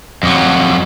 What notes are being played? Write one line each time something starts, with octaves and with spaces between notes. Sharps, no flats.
F2 F#3